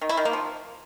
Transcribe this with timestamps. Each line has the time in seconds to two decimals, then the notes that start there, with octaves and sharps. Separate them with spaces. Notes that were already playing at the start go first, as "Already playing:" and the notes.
0.01 D#3
0.09 E4
0.17 D#3
0.25 A#3
0.33 F3